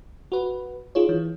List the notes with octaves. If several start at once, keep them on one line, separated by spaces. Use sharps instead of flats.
F#4 B4
D#4 F4 G#4 C#5
E3